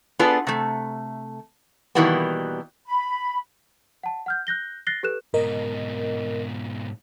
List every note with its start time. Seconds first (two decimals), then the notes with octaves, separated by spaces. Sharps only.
0.19 B3 D4 F4 G#4 A4 B4
0.47 C3 A3
1.95 B2 D#3 E3 G3 A#3 B3
2.87 B5
4.03 F#5 A5
4.26 F#5 F6 G6
4.47 F#6 G6 A#6 G7
4.87 F#6 A6 A#6 C7 G7
5.03 G4 A4 B4 F#6 E7
5.34 G#2 B2 A#4 D#5